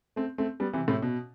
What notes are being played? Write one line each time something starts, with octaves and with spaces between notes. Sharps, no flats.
A3 C4
A3 C4
G3 B3
C3 E3
A2 C3
B2